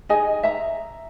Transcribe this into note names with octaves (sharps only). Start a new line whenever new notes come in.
D#4 G#4 D#5 G#5
E5 A#5